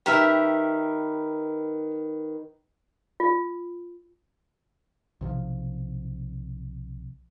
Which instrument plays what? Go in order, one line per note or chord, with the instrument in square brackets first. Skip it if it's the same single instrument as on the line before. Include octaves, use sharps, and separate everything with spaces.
[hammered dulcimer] D#3 B4 [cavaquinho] G4 A#4 E5
[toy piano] F4
[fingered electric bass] B1 C3 D#3 F3